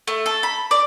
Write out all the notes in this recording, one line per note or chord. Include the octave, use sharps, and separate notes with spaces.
A3
A4
B5
D5